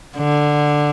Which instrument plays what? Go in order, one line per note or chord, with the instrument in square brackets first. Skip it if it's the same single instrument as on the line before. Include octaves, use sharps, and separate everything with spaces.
[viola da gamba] D3